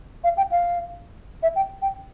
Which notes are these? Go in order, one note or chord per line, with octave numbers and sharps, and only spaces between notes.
F5
G5
F5
E5
G5
G5